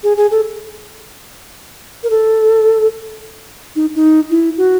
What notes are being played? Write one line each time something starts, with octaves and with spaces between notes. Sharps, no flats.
G#4
G#4
A4
A#4
A4
D#4
D#4
E4
F#4